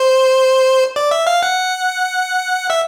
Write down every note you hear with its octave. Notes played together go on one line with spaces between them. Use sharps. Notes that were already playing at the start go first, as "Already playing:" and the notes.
Already playing: C5
D5
E5
F5
F#5
E5